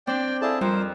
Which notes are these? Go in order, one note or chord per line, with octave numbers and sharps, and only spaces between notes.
C4 D4 D5 G5
E4 G#4 A4 D5 F5 A5
F2 G3 C4 A#4 C5